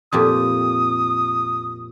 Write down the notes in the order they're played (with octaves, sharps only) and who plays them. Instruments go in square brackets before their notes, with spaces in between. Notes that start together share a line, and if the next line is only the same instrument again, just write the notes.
[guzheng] F2 A#2 G4 [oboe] D#6